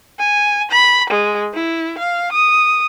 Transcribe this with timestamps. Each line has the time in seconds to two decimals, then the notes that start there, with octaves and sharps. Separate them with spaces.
0.19 G#5
0.71 B5
1.10 G#3
1.54 E4
1.98 F5
2.32 D#6